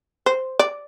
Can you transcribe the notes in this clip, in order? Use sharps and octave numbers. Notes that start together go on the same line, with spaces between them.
C5
D5